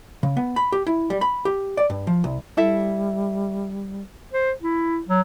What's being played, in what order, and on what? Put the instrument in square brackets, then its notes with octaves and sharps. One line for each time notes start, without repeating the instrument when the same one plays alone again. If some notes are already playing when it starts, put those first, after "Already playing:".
[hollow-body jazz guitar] C#3
B3
B5
G4
E4
G3
B5
G4
D5
G2
F3
C2
[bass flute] G3 [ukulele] E4 A4 E5
[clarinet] C5
E4
F#3